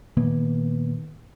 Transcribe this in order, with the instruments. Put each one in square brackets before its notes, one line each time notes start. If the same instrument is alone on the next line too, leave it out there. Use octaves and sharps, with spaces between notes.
[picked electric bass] A#2 D#3 A#3 B3